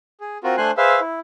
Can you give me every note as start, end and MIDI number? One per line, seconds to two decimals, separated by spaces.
0.21 0.38 68
0.44 0.56 60
0.44 0.56 65
0.44 0.56 66
0.44 0.56 70
0.57 0.71 57
0.57 0.71 62
0.57 0.71 72
0.57 0.71 80
0.57 0.71 84
0.57 0.71 90
0.77 1.00 68
0.77 1.00 71
0.77 1.00 72
0.77 1.00 76
0.77 1.00 77
0.77 1.00 88
1.00 1.20 64